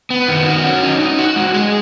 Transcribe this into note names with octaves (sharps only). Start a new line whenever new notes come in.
B3
D#3
F#4
C#4
D#4
D#4
F#4
G#3
G#4